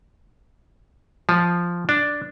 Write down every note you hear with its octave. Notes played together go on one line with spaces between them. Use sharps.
F3
D4